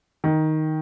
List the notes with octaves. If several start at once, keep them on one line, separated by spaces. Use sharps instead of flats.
D#3